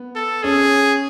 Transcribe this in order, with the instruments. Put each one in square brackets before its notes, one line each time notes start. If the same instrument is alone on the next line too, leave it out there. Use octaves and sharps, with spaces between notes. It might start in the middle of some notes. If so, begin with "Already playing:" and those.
Already playing: [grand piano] B3
[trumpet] A4
[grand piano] C#4 [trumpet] G#4